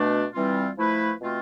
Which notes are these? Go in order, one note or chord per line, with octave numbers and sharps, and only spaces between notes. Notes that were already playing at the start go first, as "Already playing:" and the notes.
Already playing: B2 A3 D4
E3 G3 C4 F4
F3 A3 E4 B4
B2 A3 C4 F4